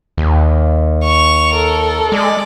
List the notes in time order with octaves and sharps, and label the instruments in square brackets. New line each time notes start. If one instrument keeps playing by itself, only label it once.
[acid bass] D#2
[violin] C#6 F7
[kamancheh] A4 [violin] A#4
[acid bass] G#3 [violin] D5